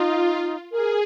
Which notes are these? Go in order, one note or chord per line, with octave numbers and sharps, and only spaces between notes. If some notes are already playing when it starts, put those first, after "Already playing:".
Already playing: D#4 F4
G#4 A#4